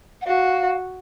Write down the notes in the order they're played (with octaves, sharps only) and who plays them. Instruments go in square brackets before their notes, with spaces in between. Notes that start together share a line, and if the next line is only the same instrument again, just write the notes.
[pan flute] F#5
[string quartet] F#4 [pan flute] F5